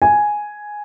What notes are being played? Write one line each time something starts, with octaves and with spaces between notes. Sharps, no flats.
G#5